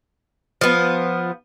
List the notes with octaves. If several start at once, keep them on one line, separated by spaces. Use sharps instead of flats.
F3 B3